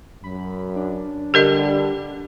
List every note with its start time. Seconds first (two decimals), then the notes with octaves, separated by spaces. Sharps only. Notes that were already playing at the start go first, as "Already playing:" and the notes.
0.24 F#2 B5
0.76 D4
1.34 D3 G3 G4 A#4 D#5